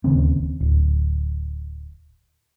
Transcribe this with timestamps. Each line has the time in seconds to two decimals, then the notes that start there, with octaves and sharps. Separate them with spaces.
0.04 D1 D#2 C#3 C4
0.61 D1